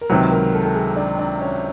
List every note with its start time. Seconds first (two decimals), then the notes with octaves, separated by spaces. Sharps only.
0.01 A#4
0.10 C#2 C3 D#3 F#3 B4
0.31 A#4
0.54 A4
0.65 A4
0.75 G#4
0.96 D4
1.19 D4
1.41 C#4